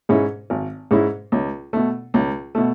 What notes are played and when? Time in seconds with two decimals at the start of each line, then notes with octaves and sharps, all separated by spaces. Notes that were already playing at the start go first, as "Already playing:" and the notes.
0.09 G#2 G#3 C#4 E4
0.50 G#1
0.91 G#2 G#3 C#4 E4
1.32 C#2
1.73 B2 A3
2.14 C#2
2.55 B2 A3